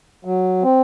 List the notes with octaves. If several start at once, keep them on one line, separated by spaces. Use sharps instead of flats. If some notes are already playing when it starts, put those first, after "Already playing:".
F#3
C4